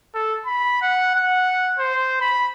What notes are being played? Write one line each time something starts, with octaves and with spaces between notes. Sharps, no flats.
A4
B5
F#5
F#5
C5
B5